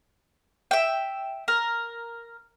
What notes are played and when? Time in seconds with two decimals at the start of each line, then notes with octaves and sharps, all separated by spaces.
0.71 E5 G5
1.48 A#4